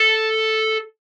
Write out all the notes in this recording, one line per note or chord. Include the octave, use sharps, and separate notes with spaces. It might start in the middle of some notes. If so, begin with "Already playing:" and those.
Already playing: A4